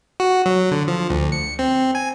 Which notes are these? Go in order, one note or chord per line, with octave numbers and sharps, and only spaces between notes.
F#4
F#3
D3
F3
D2
C#7
C4
G#5